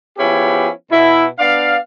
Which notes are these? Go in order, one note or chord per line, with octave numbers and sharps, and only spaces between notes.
F3 B3 C#4 E4 G4 G#4
B2 E4
B3 D4 D5 F5